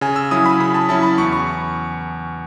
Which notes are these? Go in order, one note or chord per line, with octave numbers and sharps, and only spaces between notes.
C#3 G#5
E6
F#3 C#4 E4 D#6
B5
C#3 B5
A5
F#3 C#4 E4 A5
B5
E2 C#6
C#6